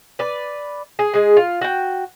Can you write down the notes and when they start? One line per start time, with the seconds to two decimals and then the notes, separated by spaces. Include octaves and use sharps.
0.19 B4 D5
0.99 G#4
1.14 G#3 G#4
1.37 F4
1.61 F#4 G5